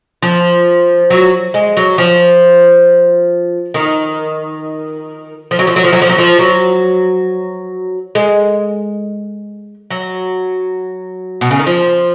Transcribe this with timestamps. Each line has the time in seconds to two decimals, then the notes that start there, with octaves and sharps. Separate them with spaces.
0.22 F3
1.10 F#3
1.54 G#3
1.77 F#3
1.98 F3
3.74 D#3
5.51 F3
5.59 F#3
5.67 F3
5.76 F#3
5.84 F3
5.93 F#3
6.02 F3
6.09 F#3
6.18 F3
6.39 F#3
8.15 G#3
9.90 F#3
11.41 B2
11.51 C#3
11.59 D#3
11.67 F3